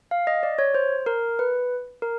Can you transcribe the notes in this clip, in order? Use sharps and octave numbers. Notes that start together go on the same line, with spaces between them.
F5
D#5
D5
C#5
C5
A#4
B4
A#4